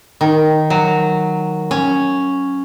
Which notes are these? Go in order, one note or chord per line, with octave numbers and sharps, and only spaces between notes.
D#3
F#3
C#4